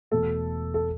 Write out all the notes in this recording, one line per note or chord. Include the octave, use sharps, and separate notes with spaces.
E1 E2 B2 A3 A4
A4